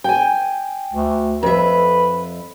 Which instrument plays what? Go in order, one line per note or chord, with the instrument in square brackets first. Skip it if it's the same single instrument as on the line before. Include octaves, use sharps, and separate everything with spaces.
[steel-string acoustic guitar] G5 G#5
[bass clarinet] D2
[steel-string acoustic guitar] F2 E5 [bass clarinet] B4